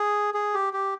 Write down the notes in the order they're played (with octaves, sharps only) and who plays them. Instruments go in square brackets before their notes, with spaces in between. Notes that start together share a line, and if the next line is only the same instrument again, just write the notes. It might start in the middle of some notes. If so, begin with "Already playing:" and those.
Already playing: [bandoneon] G#4
G#4
G4
G4